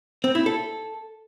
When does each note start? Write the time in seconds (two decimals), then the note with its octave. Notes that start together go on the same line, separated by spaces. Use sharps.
0.24 C4
0.35 E4
0.46 A4